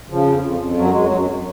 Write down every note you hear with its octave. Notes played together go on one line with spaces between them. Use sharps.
C#3 F3
F2
F2
F2
F#2 F#3
F#2 G#3
F#3
F#2